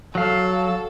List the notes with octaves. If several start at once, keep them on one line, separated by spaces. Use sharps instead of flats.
F#3 A4 F5